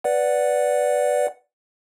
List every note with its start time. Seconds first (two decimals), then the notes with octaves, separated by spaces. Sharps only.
0.04 B4 D5 F#5